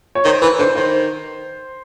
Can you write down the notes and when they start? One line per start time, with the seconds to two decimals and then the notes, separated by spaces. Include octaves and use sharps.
0.15 C#5
0.25 D#3 C5
0.42 E3 B4
0.59 D3 C5
0.76 D#3 C5